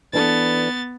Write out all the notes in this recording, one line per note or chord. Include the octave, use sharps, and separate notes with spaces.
E3 B3 D4 A4 A6